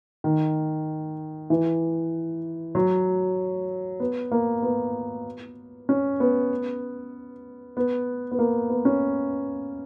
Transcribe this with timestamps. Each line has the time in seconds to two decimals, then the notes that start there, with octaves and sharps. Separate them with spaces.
0.24 D#3
1.50 E3
2.75 F#3
4.00 B3
4.32 A#3
4.62 B3
5.89 C#4
6.20 B3
7.77 B3
8.32 B3
8.39 A#3
8.70 B3
8.85 C#4